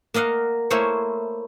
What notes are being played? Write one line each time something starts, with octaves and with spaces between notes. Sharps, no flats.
A#3 A#4 D#5 F5 F#5
A3 A#3 E4 C5 C#5